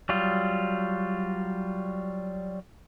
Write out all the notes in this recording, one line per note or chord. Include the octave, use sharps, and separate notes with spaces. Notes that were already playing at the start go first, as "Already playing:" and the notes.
F#3 G3 F4